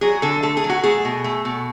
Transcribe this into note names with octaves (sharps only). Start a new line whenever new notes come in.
F#3 G#4
D3 A4
A3 A4
G#4
F#3
F#4
A3 G#4
B2
A3
B2